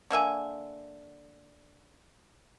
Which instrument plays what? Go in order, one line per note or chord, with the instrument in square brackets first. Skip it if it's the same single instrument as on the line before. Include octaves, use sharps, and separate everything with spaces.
[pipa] D3 A#3 E5 G#5